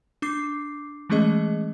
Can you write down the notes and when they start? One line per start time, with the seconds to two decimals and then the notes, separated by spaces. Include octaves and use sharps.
0.22 D4 D6 C7
1.10 E3 G#3 A3 C#4 G#4 D#5